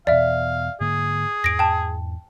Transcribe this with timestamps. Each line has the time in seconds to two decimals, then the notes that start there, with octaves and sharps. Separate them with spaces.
0.07 E2 B2 D5 E5 F5
0.81 G#2 D3 A#3 G#4
1.44 E2 G#2 A#6 D7
1.59 G5 A5